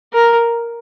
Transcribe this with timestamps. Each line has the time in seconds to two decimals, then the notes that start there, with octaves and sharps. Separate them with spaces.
0.13 A#4